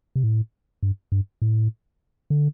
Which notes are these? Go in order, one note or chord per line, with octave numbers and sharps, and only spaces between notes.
C3
A2
G2
G2
A2
D3